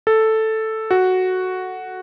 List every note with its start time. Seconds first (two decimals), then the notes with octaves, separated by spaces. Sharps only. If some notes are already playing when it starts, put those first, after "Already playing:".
0.07 A4
0.91 F#4